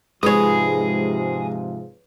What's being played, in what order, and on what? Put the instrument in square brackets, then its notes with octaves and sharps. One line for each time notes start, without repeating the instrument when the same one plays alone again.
[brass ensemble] G#2 C3 F3 [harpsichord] G#3 [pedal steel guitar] G#4 D#6 [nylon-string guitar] B4 C#5